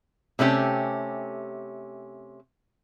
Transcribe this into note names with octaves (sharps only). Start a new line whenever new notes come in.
C3 A3 C#4 E4 G4